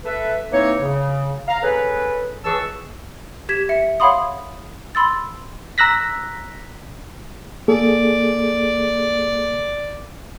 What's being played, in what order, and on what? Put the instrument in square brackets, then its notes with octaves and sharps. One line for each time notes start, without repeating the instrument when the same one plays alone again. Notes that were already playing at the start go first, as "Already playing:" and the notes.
[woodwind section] A4 B4 E5
E3 A#3 C4 D#4 C#5
C#3
F5 A#5
C#4 G#4 A4 B4
C#2 E3 G#4 A5 C#6 E6
[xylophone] G4 G#6 B6 E7
E5 C#7
C#5 F5 F#5 B5 C6 D#6
B5 C6 E6 A6
[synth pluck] A#5 E6 F#6 A#6 B6
[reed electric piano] A#3 G#4 A4 [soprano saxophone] D5